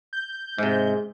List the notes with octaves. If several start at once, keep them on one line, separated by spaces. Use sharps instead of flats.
G6
G#2 C3 G#3